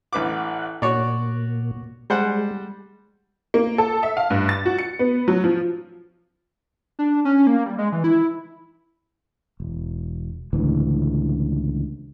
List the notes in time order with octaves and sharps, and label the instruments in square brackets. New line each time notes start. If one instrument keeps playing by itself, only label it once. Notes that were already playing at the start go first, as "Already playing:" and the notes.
[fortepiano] A1 B4 D6 [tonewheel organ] F#5
[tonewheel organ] A#2 [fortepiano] F#4 C#5 D5
[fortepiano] G3 C5 F#5 [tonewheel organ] G#3
[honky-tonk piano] A#3
A4
E5
F5
G2
A6
F#4
C#7
B3
F#3
F3
[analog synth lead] D4
C#4
A#3
G3
G#3
E3
E4
[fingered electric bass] E1
C#2 A2 D3 E3